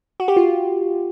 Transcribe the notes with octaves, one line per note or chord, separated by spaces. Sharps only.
F#4
G4
F4